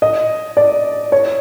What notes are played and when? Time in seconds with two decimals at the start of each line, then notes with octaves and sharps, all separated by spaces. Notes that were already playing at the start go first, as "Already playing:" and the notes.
0.02 D#5
0.57 D5
1.12 C#5